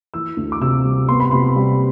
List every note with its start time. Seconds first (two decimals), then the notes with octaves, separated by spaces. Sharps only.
0.14 E3 E6
0.37 D2
0.52 D6
0.61 C3 E6
0.85 G3
1.09 B3 C6
1.20 B5
1.31 C3 C6
1.56 G3